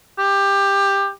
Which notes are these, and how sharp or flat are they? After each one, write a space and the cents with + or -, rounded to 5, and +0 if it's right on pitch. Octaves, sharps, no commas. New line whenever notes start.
G4 +15